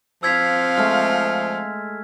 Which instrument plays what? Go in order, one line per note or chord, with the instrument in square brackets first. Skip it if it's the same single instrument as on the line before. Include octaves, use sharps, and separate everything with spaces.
[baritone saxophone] F3 [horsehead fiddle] C4 F5 [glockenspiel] E6 G#6 B6
[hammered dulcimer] G#3 A3 D6 [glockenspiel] F6